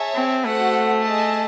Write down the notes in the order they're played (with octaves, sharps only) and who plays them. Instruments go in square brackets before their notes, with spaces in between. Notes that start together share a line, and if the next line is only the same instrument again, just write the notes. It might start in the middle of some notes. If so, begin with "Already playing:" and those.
Already playing: [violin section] G#4 C#5 E5 A5
[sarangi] C4
[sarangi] A3 [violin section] F#4 A4 C5 F#5
[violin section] G#4 D#5 A5